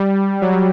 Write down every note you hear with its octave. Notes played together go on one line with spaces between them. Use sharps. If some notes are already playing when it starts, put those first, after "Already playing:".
Already playing: G3
F#3